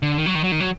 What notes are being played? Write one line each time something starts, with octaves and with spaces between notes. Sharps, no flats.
D3
D#3
F#3
D#3
F#3
D#3
F#3